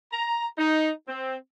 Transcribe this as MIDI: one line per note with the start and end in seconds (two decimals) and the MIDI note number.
0.12 0.45 82
0.58 0.90 63
1.08 1.36 60